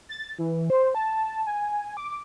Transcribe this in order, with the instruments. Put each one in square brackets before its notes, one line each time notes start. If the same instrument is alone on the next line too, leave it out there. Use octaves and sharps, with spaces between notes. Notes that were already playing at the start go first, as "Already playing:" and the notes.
[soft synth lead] A6
E3
C5
A5
G#5
D6